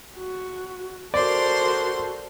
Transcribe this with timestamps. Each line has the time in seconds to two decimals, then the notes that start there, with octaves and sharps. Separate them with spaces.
0.18 F#4
1.14 F#4 A4 A#4 C5 D5 C6